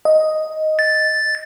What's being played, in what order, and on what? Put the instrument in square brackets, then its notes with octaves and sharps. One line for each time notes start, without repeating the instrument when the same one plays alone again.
[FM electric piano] D#5
[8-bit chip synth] A6